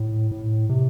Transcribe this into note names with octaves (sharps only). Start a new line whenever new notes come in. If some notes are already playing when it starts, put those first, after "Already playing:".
Already playing: A2
A2
C3